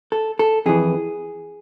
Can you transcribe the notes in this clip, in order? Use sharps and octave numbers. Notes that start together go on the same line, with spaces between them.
A4
A4
F2 E3 G#4